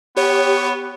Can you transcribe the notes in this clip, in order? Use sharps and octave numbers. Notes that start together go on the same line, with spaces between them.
B3 G4 C#5